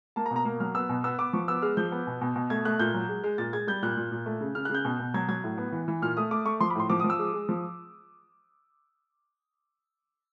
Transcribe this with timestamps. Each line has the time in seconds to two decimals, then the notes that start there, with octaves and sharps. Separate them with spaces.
0.16 A#3 A5
0.26 A#5
0.31 B2
0.36 A#5
0.45 A#3
0.60 F#3 F6
0.75 B3 E6
0.89 B2
1.04 B3 E6
1.19 B3 D6
1.33 F3 C#6
1.48 B3 E6
1.62 G#3 F6
1.77 F3 G6
1.92 B3
2.07 B2
2.21 B2
2.36 B2
2.50 A3 G#6
2.65 A3 F#6
2.80 A#2 G6
2.94 F#3
3.09 G#3
3.24 G#3
3.38 A#2 A6
3.53 G#3 G#6
3.67 G3 G6
3.82 A#2 F#6
3.97 A#2
4.12 A#2
4.26 A3
4.41 C#3
4.55 C#3 F6
4.65 F#6
4.70 C#3 G6
4.85 B2
4.99 B2
5.14 F#3 G#6
5.29 F#3 G#6
5.44 A2
5.58 B3
5.72 E3
5.88 E3
6.02 A#2 F6
6.17 A3 D#6
6.31 A3 D6
6.46 A3 C#6
6.60 F3 C6
6.70 B5
6.75 A2 C6
6.90 F3 D6
7.00 D#6
7.04 F3
7.10 E6
7.19 G#3
7.34 G#3
7.49 F3